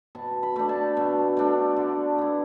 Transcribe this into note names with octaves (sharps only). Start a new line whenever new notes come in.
B2 A5
B5
A3 D4
A5
B2
A3 D4
D3
B3 E4